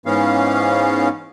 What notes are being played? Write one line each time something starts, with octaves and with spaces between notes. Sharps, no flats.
G#2 E3 B3 C#4 F5